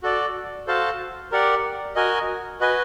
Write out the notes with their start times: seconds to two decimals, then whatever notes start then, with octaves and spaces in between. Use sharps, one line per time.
0.03 F#4 A4 D5
0.67 F#4 A4 C5 F5 A5
1.32 G4 A#4 D5 F#5
1.95 F#4 A#4 D#5 G#5
2.60 F#4 B4 D#5 G#5